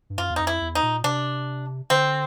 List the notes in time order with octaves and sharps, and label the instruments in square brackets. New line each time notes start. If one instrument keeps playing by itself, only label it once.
[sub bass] G2
[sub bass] F#2 [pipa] F4
[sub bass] E2
[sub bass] F2 [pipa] D#4
[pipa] E4
[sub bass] E2
[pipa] D#4
[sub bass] A#2
[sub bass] C3 [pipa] D4
[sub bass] D3 [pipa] C4